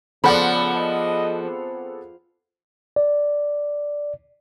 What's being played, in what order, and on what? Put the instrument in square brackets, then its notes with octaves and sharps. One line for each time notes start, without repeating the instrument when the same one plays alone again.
[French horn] C#3 [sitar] F3 [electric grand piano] B3 G#4 A4 [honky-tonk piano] D5 F#5 B5
[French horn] D#5
C4
[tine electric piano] D5